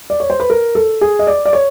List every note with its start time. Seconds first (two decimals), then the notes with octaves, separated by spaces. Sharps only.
0.10 D5
0.20 C#5
0.30 C5
0.40 B4
0.50 A#4
0.75 A4
1.01 G#4
1.19 D#5
1.27 D5
1.46 D5
1.53 C#5